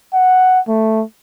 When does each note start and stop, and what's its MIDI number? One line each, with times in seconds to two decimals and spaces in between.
0.14 0.60 78
0.68 1.03 57